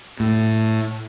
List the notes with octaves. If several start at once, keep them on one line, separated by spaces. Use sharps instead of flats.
A2